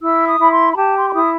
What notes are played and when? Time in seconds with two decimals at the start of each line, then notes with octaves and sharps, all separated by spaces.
0.01 E4 E6
0.26 D#6
0.39 E4 B5
0.51 C6
0.70 B5
0.76 G4 A5
0.96 C6
1.09 C6
1.14 E4 D#6